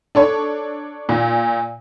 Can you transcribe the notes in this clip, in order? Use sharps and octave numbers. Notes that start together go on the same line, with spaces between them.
D4 A4 C#5
A#2